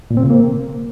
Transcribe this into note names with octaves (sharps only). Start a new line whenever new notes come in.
A#2
C4
C#3
A#3